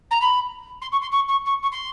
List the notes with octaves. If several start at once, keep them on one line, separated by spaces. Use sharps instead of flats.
A#5
B5
C6
C#6
C6
C#6
C#6
C#6
C#6
C6